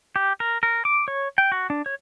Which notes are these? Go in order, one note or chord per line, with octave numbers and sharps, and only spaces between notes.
G4
A#4
A#4
D6
C#5
G5
F#4
D4
C#5